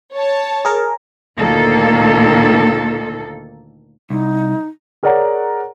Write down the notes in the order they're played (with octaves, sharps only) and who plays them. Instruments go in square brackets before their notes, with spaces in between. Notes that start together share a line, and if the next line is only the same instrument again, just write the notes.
[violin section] C#5 A5
[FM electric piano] G#4 A#4
[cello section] D2 A#2 D#3 A#3 A4
[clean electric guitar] C2 [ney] D#4
[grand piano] G#4 A#4 C#5 D5 F#5 A#5